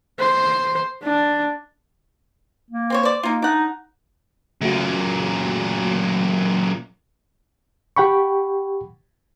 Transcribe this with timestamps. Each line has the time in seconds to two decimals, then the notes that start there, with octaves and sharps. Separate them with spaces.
0.19 C5
1.03 D4
2.71 A#3
2.90 C4 C5 C#5
3.03 C5 D5
3.23 A#3 D#4 F4
3.42 D4 D#4 F#5
4.61 F#2 A#2 C#3 A3 F#4
7.96 G4 F#5 G5 B5 C#6